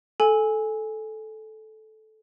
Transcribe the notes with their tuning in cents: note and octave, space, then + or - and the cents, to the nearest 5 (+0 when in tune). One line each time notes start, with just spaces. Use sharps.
A4 -15 G#5 +0